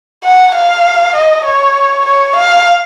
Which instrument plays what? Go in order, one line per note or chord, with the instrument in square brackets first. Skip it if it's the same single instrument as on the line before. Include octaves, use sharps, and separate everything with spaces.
[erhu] F#5
F5
D#5
C#5
C#5
F5